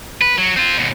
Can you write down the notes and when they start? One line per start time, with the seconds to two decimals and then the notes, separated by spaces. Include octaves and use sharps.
0.21 B4
0.38 F#3
0.57 C4 F4
0.77 D#2 B2